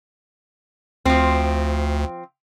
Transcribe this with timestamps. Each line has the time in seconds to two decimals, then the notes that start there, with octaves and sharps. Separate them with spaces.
1.06 D2 F3 C4